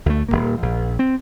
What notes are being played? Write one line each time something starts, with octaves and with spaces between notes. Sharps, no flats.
D2 A3
D#1 B1 A#3
A#1
C4